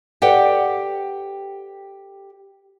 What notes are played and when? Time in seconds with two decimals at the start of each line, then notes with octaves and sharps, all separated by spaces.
0.22 G4 A4 B4 D5 F#5 G5